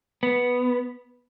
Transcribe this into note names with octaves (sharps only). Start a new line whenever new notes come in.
B3